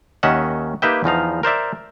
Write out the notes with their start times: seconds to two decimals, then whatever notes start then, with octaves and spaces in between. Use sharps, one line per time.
0.23 D#2 D#3 C#4 D#5 E5 F#5
0.82 A#3 D#4 G4 B4 E5 G5
1.04 E2 F3 D#4 F5
1.43 A#4 C5 D5 E5